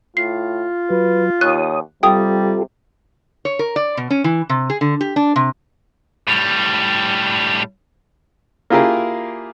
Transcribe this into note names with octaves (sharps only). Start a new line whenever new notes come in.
A2 F4 C7
F#3 B4
D#2 C#5 D#6 F#6
C3 G3 F4 G4 A4 G5 D#6
C#5
A#4
D5
B2
C#4
E3
C3
G#4
D3
G4
D4
C3
A2 G3
A#3 E4 F4 G4 G#4 A#4